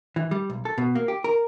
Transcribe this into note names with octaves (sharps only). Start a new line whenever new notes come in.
E3
G3
B1
A4
B2
A#3
G4
A#4